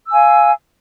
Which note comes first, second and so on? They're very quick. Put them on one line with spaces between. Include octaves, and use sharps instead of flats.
E6 G#5 F5